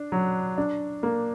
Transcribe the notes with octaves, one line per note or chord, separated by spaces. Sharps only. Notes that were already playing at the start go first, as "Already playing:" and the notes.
Already playing: D4
F#3
D4
A#3